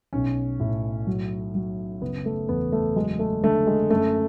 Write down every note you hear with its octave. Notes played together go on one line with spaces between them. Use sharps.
B1 C#4
A2
F#3
F#3
F#1 B3
A3
E2 B3
A3
F#3 G#3
A3
D3 A3
G#3
F#2 A3